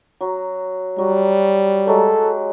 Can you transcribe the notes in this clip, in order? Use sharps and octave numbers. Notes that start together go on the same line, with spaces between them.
F#3
F#3 G3
F#3 G#3 G4 A4